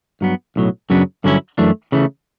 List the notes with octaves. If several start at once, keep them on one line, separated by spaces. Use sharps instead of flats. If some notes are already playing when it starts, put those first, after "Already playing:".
G2 F#3 B3
B1 A2 F#3
F#2 C#3 F#3 B3 D4
G2 D3 F#3 C#4 E4
F#2 E3 A3 D4
C#3 E3 A3